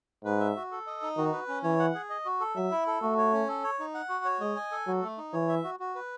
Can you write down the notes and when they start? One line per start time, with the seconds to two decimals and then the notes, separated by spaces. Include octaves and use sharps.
0.24 G#2 B4
0.40 E5
0.56 F#4
0.71 A4
0.87 D#5
1.02 D#4
1.17 D#3 F#4
1.32 B4
1.48 C#4
1.63 E3 C#5
1.79 F#5
1.95 G#4
2.10 D#5
2.25 F#4
2.40 A4
2.56 F#3 E5
2.71 E4
2.87 A4
3.02 A3 F#4
3.18 C#5
3.33 C#4
3.48 A4
3.64 C#5
3.79 D#4
3.94 F#5
4.09 F#4
4.25 C#5
4.40 G#3 D#5
4.56 G#5
4.72 A4
4.87 F#3 F#4
5.02 A3
5.18 D#4
5.33 E3 C#5
5.49 E5
5.64 F#4
5.80 F#4
5.95 B4